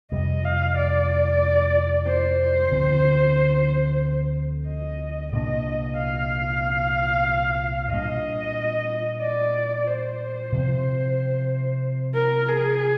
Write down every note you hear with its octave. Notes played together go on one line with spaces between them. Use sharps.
F2 C3 G3 D#5
F5
D5
C5
D2 D3 F3 C4
D#5
C2 A#2 G#3 D4 D#5
F5
A#2 G3 A#3 D4 D#5
D5
C5
C3 F3 C4
A#4
G#4